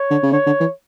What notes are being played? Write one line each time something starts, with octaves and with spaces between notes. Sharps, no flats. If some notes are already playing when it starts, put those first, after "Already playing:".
Already playing: C#5
D3
C#3
D3 C#5
D3
E3